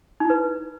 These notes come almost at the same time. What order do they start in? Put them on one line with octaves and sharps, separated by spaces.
D#4 E4 B4